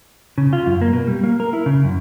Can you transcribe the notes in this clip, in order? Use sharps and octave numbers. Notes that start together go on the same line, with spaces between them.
C#3
F4
F#2
A#3
B2
G3
A#3
A#4
E4
C#3
F#2